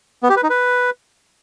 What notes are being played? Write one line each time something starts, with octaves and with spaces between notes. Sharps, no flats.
B3
G4
B4
D#4
B4